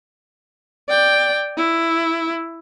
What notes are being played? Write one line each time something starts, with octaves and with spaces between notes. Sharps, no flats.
D5 G5
E4